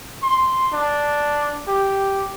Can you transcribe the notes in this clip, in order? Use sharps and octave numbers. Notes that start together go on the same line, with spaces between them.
C6
D4
G4